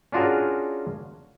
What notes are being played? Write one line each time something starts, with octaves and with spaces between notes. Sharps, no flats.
C#4 D4 F4 F#4 G#4 A#4